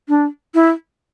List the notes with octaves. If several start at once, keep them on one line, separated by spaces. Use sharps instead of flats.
D4
E4